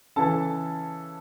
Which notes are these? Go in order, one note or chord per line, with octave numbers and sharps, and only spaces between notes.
C#3 E3 A4 A5